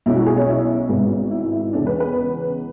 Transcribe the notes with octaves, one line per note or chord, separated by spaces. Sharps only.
B1 B2 G#3 C#4 E4
F#4
G#4
C#5
E4
G#1 G#2 G#3 B3
E4
E4
E2 C#3 G#3 C#4 D4
B4
B4